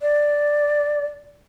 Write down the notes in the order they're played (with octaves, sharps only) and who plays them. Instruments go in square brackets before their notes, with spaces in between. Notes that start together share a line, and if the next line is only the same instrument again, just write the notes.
[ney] D5